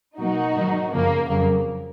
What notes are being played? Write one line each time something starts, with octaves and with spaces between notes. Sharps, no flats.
B2 F#3 A#3 D#4 F#4
G#2 D#3 F#3
F#2 C#3 F3 A#3
F2 C#3 F#3 A#3